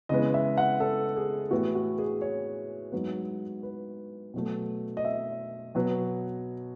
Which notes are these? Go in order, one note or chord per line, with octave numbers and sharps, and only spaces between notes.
C#3 E3 G#3 B3 D#5
E5
F#5
A4
G#4
A2 E3 B3 F#4
F#4
G#4
C#5
G#2 F#3 B3
B4
B2 F#3 A3
D#5
E5
B2 F#3 B3